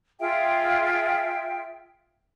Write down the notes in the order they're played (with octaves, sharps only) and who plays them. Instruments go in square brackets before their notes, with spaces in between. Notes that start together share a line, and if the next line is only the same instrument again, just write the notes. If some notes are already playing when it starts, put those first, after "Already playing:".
[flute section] F4 G#4 E5 G5